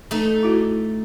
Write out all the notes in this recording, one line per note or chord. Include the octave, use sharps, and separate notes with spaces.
A3 D#4
E4 F#4